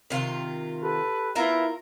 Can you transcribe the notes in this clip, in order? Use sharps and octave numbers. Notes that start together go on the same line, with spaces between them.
C3 D#3 F4
G4 A4 B4
B3 E4 F4 A#4 E5 F5